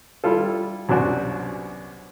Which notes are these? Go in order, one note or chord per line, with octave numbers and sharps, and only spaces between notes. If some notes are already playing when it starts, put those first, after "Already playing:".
G3 E4 F4 A4
C2 F#2 B2 D4 F#4